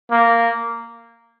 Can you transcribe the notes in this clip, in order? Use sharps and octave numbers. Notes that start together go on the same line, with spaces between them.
A#3